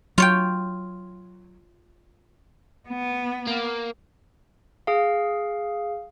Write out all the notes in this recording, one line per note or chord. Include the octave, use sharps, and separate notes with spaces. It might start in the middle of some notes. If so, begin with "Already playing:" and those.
F#3 F4 C#5 G5
B3
A#3
G#4 F5